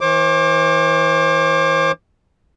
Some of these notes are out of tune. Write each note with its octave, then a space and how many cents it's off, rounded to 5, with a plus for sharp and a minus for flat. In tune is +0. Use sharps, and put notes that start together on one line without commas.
E3 -20 C5 +45 D6 +5